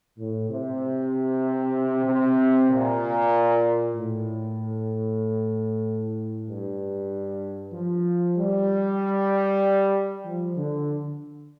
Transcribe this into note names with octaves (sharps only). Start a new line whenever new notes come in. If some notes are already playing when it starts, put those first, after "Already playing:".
A2
C3
C3
A#2
A2
G2
F3
G3
F3
D3